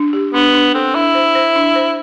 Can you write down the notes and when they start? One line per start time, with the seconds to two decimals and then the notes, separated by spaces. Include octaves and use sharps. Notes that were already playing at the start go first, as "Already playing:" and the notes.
Already playing: D4
0.13 G4
0.34 B3 D4
0.54 D4
0.74 C4 A4
0.95 D4 E4
1.15 C5
1.35 C5
1.56 D4
1.75 C5